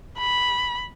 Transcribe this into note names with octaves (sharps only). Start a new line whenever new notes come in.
B5